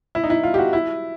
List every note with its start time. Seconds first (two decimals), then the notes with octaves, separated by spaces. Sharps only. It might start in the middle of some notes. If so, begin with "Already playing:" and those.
0.15 E4
0.24 D#4
0.30 E4
0.43 F4
0.54 G4
0.58 F#4
0.73 E4